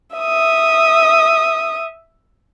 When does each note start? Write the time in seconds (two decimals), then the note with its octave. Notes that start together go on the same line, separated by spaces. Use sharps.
0.16 E5 D#6